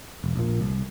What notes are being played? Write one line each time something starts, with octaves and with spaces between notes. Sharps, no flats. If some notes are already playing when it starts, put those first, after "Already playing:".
E1
A#1 A#2
C2